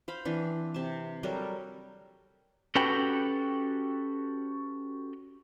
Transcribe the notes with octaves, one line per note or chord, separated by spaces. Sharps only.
C5 F5 B5
E3 C4 D4
C3 A5
F#3 G3 A4 A#4
C#4 F#4 G4 A4 B4 G5